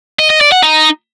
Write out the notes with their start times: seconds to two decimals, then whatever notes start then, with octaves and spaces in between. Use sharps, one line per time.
0.19 D#5
0.30 D#5
0.41 D5
0.52 F#5
0.63 D#4